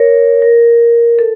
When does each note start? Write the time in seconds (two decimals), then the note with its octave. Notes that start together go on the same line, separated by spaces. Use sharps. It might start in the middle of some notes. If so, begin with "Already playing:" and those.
Already playing: A#4 C#5
0.42 A#4
1.19 A4